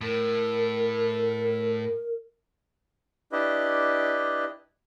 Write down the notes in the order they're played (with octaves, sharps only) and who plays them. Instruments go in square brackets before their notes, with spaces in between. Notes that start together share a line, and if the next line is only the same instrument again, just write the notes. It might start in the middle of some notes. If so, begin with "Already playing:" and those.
[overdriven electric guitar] A2 [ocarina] A#4
[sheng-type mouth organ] D4 E4 G4 B4 D#5